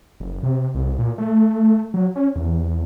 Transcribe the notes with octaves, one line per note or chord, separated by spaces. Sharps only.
F#1
C3
C2
A#2
A3
F#3
C#4
E2